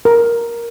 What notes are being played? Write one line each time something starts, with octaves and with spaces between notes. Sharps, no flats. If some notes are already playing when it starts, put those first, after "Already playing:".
A#4